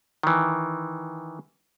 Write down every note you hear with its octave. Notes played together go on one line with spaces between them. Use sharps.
D#3 E3